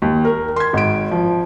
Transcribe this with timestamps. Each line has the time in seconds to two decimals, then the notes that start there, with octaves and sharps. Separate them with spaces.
0.02 D#2
0.25 A#4
0.56 C6 G#6
0.73 G#1 D7
1.11 F3